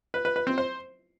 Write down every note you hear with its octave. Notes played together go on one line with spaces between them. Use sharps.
B4
B4
B4
C4
C5